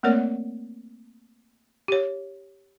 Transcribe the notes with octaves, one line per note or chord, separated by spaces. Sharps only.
A3 A#3 C4 A#4 C#5 D5
G4 C#5